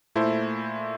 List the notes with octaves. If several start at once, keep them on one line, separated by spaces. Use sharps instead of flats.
A#2 A3 E4 A4 C5